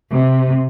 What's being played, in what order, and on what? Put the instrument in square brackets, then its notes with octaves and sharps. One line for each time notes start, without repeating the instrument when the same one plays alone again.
[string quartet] C3